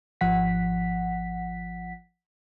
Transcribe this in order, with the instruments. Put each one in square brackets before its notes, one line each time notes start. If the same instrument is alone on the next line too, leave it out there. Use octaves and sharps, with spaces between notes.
[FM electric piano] G#1 F3 F#5 B6